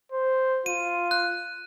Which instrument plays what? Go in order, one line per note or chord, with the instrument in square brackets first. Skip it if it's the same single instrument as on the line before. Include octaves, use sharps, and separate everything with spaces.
[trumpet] C5
[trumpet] F4 [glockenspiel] D#7
[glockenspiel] F#6